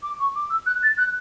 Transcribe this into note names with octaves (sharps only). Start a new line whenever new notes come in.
D6
C#6
D6
E6
F#6
A6
F#6